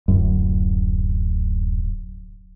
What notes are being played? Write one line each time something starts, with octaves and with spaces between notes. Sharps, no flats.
D1 F#2